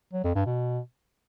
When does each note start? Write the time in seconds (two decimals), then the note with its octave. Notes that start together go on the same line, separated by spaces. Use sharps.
0.13 F#3
0.24 F2
0.35 G2
0.46 B2